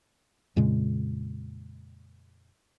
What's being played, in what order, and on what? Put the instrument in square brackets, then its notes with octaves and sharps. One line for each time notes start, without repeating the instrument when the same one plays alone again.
[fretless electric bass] F2 A#2 C#3 G#3